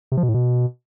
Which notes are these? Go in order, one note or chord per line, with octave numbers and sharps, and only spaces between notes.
C3
F3
B2
A2
B2